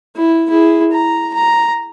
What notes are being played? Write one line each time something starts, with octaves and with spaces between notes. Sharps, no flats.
E4
E4 G#4
A#5
A#5